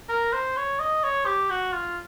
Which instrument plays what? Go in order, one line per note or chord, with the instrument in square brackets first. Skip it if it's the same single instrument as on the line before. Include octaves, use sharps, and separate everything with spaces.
[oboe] A#4
C5
C#5
D#5
C#5
G4
F#4
F4